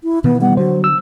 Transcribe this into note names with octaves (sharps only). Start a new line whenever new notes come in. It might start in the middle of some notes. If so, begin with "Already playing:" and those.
E4
B2 D#3 E3 B3
G3 B3 F#5
D3 F#3 C5
E6